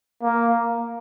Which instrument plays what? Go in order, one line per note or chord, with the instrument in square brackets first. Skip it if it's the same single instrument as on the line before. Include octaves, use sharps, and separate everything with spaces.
[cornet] A#3